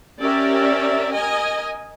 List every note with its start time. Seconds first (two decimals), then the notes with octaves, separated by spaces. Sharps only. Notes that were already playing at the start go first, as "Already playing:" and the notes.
0.19 C#4 G4 A#4 D5 E5
1.13 A#4 D#5 G#5